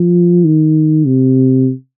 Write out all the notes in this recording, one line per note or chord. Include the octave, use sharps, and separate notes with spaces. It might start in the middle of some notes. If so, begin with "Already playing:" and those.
Already playing: F3
D#3
C3